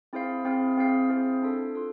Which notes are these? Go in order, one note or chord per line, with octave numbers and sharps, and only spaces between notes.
C4 E4 G#4 C5 F5
C4 E4 G#4 C5 F5
C4 E4 G#4 C5 F5
C4 E4 G#4 C5 F5
D4 F4 A4
F4 A4